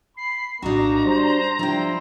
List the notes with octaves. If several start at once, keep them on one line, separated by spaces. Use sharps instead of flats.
B5 C7
A#1 A2 A#3 D4 D#4 F#4 A#5
G3 C5
F3 G3 D4 E4 F4 C5 G5